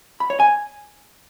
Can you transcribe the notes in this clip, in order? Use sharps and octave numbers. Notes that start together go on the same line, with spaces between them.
B5
C#5
G#5